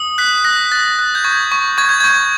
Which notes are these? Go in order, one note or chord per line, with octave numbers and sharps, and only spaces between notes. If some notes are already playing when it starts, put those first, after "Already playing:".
Already playing: D#6
F#6 B6
F#6 A#6
F#6 A6
F#6
G6
C#6 G#6
C#6
C#6 G#6
G6
C#6 G#6